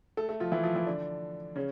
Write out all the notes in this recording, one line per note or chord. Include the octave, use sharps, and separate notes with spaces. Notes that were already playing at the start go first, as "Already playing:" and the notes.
A3 A4
A3 A4
F3 F4
E3 E4
F3 F4
E3 E4
D3 D4
C#3 C#4